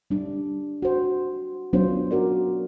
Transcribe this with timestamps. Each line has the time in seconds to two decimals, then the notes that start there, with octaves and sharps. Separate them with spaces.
0.10 G3 D4
0.82 F#4 C5
1.73 F#3 B3 C#4 D4 F4 C5
2.11 F#4 A#4 D5